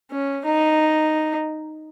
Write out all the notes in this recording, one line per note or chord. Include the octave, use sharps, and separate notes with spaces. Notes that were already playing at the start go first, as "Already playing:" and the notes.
C#4
D#4